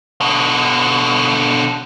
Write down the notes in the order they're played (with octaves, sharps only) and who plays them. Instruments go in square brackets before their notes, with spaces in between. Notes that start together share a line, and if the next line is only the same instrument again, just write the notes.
[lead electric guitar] B2 D3